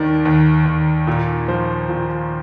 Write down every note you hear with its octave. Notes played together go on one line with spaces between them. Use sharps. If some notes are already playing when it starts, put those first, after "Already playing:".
Already playing: D#2 D#3 D5
D#2
D#2
A#2
F3 C5
A#2